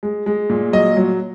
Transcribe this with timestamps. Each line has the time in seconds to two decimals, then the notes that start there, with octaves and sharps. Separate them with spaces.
0.03 G#3
0.26 G#3
0.49 A#2
0.73 F#3 D#5
0.97 F#3